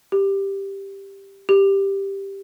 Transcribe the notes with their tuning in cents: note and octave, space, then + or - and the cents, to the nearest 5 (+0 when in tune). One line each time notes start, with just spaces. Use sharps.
G4 +5
G4 +5